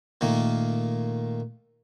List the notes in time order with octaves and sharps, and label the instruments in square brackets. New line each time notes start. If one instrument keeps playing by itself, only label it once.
[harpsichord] A#2 D#3 A3 A#3